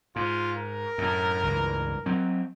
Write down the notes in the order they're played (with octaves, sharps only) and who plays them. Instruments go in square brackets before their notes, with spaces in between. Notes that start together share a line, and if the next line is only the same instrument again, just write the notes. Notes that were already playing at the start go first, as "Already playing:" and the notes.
[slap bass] G#2 [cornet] F4
[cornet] A#4
[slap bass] F#2 A2
C#2 G2 E3
F#3 C4